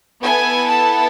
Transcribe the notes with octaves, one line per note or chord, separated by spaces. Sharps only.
B3 E4 A4 G#5
A5